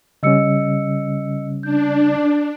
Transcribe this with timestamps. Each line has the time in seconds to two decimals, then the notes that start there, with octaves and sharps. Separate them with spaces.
0.23 C#3 G3 C#4 D#5 E6 C#7
1.63 D4 G6